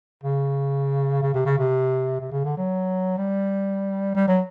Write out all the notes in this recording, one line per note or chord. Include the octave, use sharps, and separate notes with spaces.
C#3
C#3
C3
C#3
C3
C3
C#3
D3
F#3
G3
G3
F#3